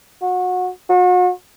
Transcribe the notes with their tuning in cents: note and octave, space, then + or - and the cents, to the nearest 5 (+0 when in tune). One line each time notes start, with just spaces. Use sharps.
F#4 -25
F#4 -40